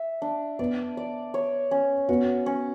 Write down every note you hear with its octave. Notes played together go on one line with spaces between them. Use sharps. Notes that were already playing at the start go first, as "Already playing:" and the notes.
Already playing: E5
D4
B3 D5
D5
C#5
C#4
B3 F#4
C#4